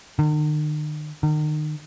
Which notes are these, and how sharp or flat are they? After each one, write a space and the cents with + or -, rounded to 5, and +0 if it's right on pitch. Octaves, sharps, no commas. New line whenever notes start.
D#3 -45
D#3 -35